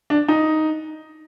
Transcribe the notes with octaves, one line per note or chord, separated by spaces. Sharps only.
D4
D#4